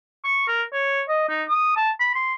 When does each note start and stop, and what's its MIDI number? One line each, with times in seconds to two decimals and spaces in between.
0.25 0.43 85
0.48 0.63 70
0.73 1.02 73
1.09 1.27 75
1.29 1.43 63
1.49 1.75 87
1.76 1.91 81
2.00 2.12 83
2.15 2.34 84